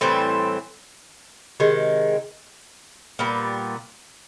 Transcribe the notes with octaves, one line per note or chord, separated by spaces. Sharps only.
A2 E3 G3 C4
C3 D#3 G#3
A#2 G3 B3